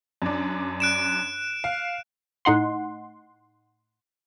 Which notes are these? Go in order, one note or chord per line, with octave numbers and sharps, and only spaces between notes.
F#2 D4
F#6 D7 E7
F5
A2 D#4 F#5 C6